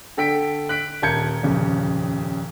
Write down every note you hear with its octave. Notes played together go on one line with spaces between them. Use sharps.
D3 A4 G5 B6 D7
F#6 B6 D7
D#1 A#4 A5 G6 G#6 C#7
D#1 F2 C#3